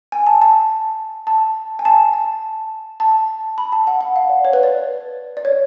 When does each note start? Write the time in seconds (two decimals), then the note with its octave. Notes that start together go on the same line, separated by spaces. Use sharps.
0.12 G#5
0.27 A5
0.42 A5
1.27 A5
1.79 G#5
1.85 A5
2.13 A5
3.00 A5
3.58 B5
3.72 A5
3.87 F#5
4.01 F#5
4.16 F5
4.29 D5
4.45 C#5
4.53 B4
4.63 D5
5.37 D5
5.45 C#5